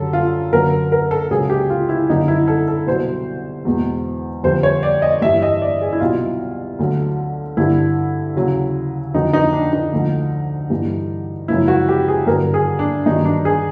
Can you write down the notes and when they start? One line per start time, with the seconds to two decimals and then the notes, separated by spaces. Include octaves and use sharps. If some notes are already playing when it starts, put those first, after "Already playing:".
Already playing: F#2 D3 G3 A4
0.13 F4
0.52 F#2 D3 F#3 A#4
0.92 A#4
1.11 A4
1.31 C#2 C#3 F#3 G#4
1.50 G4
1.70 F4
1.89 E4
2.09 F#2 D3 G3 D#4
2.28 E4
2.48 A4
2.68 A4
2.87 C2 B2 F#3 C5
3.65 E2 B2 G#3
4.43 F2 D3 G3 C5
4.63 C#5
4.83 D5
5.02 D#5
5.22 G2 E3 G3 E5
5.42 D#5
5.62 D5
5.82 G#4
5.93 E4
6.00 C2 B2 F#3 F4
6.79 D2 D3 F#3
7.57 G2 D3 G3 E4
8.35 D#2 C#3 F#3
9.14 F2 D3 F#3 D#4
9.33 D#4
9.53 D4
9.73 D#4
9.92 D2 D3 F3
10.70 G2 E3 G3
11.48 F#2 C#3 F3 G#3 E4
11.68 F#4
11.88 G4
12.08 G#4
12.27 G2 D3 F#3 A#4
12.54 G#4
12.79 D4
13.06 G2 D#3 F#3 D#4
13.25 D4
13.45 G#4